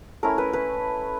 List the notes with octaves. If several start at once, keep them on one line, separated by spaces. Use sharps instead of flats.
A3 C#4 E4 A#4
B4
B4